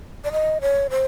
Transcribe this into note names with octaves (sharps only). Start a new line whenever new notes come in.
D5
D#5
C#5
C5